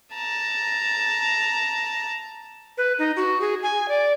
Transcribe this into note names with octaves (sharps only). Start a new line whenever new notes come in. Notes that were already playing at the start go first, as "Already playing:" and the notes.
A5 A#5
B4
D#4
F#4
G#4
G#5
D5